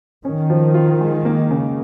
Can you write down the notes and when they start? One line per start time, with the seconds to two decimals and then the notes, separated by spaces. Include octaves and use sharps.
0.25 D#3 C#4
0.50 F3
0.74 F4
1.01 G#3
1.25 A#3
1.51 C#3